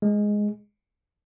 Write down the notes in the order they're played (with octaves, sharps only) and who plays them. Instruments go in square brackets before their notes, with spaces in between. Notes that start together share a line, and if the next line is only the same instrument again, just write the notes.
[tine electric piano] G#3